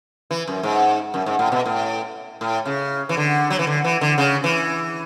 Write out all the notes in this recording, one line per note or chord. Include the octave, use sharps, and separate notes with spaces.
E3
F#2
G#2
F#2
G#2
A2
B2
A2
A2
C#3
E3
D3
F#3
E3
D3
E3
D3
C#3
E3